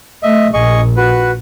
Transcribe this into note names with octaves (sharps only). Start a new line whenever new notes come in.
A3 D#5 E5
A#1 G#4 D#5 C#6
F#4 B4